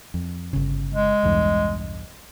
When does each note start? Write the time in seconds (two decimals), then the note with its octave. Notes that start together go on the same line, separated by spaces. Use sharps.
0.14 F2
0.53 G1 C#3
0.93 G#3
1.23 B1 E2 G2